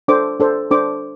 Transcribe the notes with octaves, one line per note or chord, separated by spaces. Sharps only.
D4 A4 C5 D6
D4 A4 C5
D4 A4 C5 D6